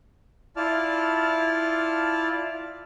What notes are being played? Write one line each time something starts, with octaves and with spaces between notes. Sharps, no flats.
E4 F4 D5 A5 F6